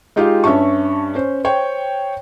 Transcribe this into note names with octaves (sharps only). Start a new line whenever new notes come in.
G#3 D#4 F4 G4 G#4 F5
G2 C#4 E5 A5 C#6
C#4 C5
C5 C#5 G5